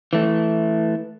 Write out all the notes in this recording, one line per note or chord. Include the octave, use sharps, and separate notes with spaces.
E3 A3